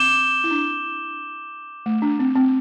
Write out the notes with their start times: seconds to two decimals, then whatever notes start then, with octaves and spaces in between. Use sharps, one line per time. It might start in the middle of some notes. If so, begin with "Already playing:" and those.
Already playing: C4 D6 G6 E7 G7
0.44 E4
0.51 D4
1.86 A3
2.02 D4
2.19 C4
2.35 C4